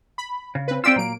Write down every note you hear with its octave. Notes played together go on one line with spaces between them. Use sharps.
B5
C#3
C4 B4
C4 F4 G4 D5 G5 E6
A#2 F#3 A#3 D7